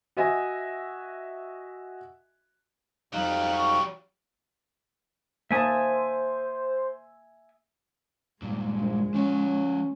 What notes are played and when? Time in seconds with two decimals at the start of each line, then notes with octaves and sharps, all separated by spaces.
0.17 F#4 D#5 E5 G#5
3.13 F2 F#3 G3 D#4 F5
3.52 C#6
5.51 A#3 C5 E5 G#5 A5 D#6
8.42 G2 A#2 G#3
8.79 A#1
9.14 F3 C#4 C#5